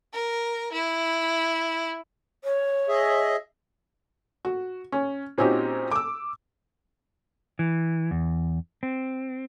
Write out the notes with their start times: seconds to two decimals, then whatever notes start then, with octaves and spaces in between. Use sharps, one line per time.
0.13 A#4
0.72 E4
2.44 C#5
2.88 G#4 D#5 E5
4.45 F#4
4.92 C#4
5.38 A#2 C4 C#4 D#4 F#4 G4
5.91 D6 E6
7.59 E3
8.11 E2
8.83 C4